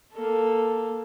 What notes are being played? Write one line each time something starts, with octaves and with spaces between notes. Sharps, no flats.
A#3 A4